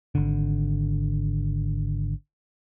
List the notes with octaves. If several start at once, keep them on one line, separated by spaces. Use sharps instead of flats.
G#1 D3